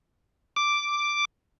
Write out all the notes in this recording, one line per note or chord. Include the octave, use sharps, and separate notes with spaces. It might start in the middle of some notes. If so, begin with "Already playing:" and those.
D6